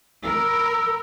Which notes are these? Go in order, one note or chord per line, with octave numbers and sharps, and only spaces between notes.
A#4 A#5 B5 E6